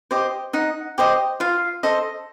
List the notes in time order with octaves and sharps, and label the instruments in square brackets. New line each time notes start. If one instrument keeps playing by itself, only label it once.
[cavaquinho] G4 C5 D#5
D#4 F#5
G4 C5 D#5
F4 F5
A4 C5 D#5